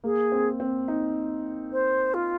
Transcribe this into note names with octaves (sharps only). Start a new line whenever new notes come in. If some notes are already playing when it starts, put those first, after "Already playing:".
A#3 G#4
C4
C4
D#4
C5
F4